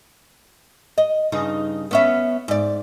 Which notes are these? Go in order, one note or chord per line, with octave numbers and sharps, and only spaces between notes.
D#5
G2 C#3 D#4
B3 C#4 E5
G#2 D5